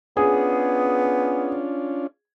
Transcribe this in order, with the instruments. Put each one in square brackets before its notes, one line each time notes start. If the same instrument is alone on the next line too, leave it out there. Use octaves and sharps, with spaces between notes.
[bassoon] B3 [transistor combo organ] C#4 D4 F4 [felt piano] G#4